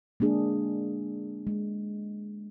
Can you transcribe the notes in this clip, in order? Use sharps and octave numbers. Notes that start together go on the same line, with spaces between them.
G#3 A#3 D4 G#4
G#3